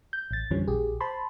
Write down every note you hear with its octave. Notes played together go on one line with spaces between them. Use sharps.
G6
A1 A6
F2 D3 E3 F3 G3 C#4
A#1 G4 G#4
C5 A5 B5 C6